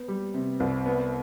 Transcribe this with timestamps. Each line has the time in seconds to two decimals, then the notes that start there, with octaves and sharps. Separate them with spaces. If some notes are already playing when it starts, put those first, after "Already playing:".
Already playing: B3
0.08 G3
0.34 C3
0.60 C2
0.86 B3